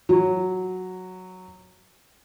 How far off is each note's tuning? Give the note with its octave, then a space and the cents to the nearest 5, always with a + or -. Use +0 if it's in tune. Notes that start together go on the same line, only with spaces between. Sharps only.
F#3 -5